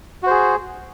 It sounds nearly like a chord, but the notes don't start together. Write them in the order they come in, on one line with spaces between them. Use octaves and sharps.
F#4 C5 G#4